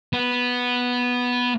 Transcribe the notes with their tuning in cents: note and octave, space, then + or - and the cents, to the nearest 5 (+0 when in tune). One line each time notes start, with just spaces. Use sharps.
B3 -5